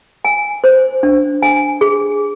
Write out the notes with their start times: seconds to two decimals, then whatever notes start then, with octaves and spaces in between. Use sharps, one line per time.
0.25 G#5
0.64 C5
1.03 D4
1.42 G#5
1.81 G#4